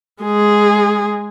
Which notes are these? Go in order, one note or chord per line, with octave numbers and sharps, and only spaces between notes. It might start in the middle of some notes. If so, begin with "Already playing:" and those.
G#3 G#4